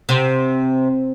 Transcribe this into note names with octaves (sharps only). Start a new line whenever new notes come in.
C3